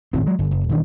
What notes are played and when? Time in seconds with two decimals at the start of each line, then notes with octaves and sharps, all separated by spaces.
0.13 D#1 G#1 A2 C4
0.26 F#3 G#3
0.39 G1
0.51 F#1
0.69 D#1 D#3 E3 D4